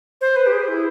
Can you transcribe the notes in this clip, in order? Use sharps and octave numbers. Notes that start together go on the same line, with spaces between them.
C5
B4
G4
G#4
E4